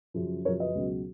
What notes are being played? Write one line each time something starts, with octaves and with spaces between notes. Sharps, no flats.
F#2 C#3 F3
F#2 C#3 F3 A#4 C#5
B4 D#5
C#2 B2 F#3